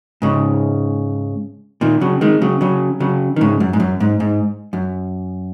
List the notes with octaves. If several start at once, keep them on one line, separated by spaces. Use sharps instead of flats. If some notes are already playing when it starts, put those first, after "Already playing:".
G#2 C#3
A#2 D#3
C#3 F#3
D#3 G#3
C#3 F#3
C#3 F#3
C#3 F#3
D#3
G#2 C#3
F#2
G#2
F#2
G#2
G#2
F#2